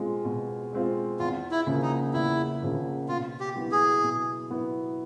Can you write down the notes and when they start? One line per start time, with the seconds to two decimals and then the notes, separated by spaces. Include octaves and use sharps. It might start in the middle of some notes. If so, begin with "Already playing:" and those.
Already playing: B2 G#3 C4 F4
0.25 B2
0.73 G#3 C4 F4
1.19 E2 F4
1.51 E4
1.67 C#3 F3 A#3
1.82 D#4
2.14 E2 E4
2.62 C#3 F3 A#3
3.08 B2 F4
3.40 G4
3.55 F#3 B3 E4
3.72 G#4
4.03 B2
4.50 F#3 B3 E4